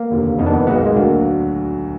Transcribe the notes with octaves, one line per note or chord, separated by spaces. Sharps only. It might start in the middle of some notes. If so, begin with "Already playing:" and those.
Already playing: A#3
F1 D#2 D3
F1 F2 D#3 A#3 B3 D#4
D4
B3
B1 A#2 G#3 B3 D#4 F#4
A#3
G#3
D2 D3 F#3 A#3 D4 F#4